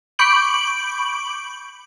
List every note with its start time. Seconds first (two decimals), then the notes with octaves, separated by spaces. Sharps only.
0.19 B5 C#6 D6 G6 D7 F#7